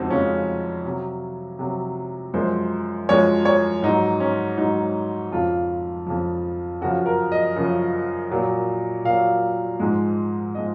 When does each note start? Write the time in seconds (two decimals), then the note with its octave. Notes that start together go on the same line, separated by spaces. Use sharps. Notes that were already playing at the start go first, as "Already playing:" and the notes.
Already playing: F2 C#3 G#3 C4 D#4 F#4
0.10 F2 C#3 G#3 C#4
0.85 C3 F#3
1.59 C3 F#3
2.34 F#2 F3 G#3 C5
3.09 F#2 F3 G#3 C#5
3.45 C#5
3.82 G#2 F#3 D#4
4.20 C#4
4.58 G#2 F#3 D#4
5.32 F2 C#3 F3 F4
6.07 F2 C#3 F3
6.81 F#2 C#3 F3 F#4
7.06 A#4
7.32 D#5
7.56 F#2 C#3 F3
8.31 A#2 F#3
9.04 A#2 F#3 F5
9.80 G#2 F3 G#3
10.55 F3 G#3 D#5